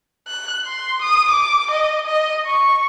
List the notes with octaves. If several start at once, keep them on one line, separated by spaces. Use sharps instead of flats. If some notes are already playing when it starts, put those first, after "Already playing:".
F#6
C6
D#6
D6
D#5
D#5
C#6